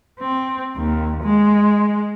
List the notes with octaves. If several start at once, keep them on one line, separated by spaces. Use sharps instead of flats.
C4
D#2
G#3